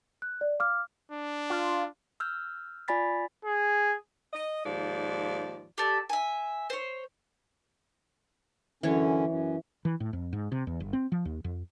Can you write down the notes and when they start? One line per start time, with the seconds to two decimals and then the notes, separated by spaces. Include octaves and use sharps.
0.22 F#6
0.41 D5
0.59 F5 D6 F6
1.11 D4
1.50 F4
2.20 E6 F6 G6
2.88 F4 D5 G#5 B5 A6 B6
3.45 G#4
4.33 D#5
4.64 D#2 G#2 F3 D5
5.78 G4 A4 D5
6.10 E5 G#5
6.70 C5 C#5
8.83 F#2 D3 E3 C#4 C#5
9.27 F#2
9.85 E3
10.00 A2
10.13 F2
10.33 G#2
10.52 C3
10.67 E2
10.80 G1
10.93 C4
11.12 F3
11.25 D#2
11.44 F2